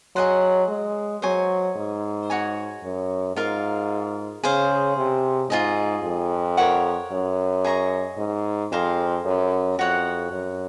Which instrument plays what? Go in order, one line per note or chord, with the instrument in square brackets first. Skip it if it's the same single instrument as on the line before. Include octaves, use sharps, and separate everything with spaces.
[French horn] F#3 [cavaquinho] G#4 D#5 F#5 C6
[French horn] G#3
[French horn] F#3 [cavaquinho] C5 D#5 G#5 C#6
[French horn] G#2
[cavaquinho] F#4 C#5 G#5
[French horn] F#2
[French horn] G#2 [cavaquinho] F4 A#4 F5
[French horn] C#3 [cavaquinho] G#4 C5 F5
[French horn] C3
[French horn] G#2 [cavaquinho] F4 G#4 D#5
[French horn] F2
[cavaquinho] A#4 C#5 F#5
[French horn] F#2
[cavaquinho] G#4 D#5 A#5 C#6
[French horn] G#2
[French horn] F2 [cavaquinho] G#4 C5 F5 A#5
[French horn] F#2
[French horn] F2 [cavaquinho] F#4 C#5 F#5
[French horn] F#2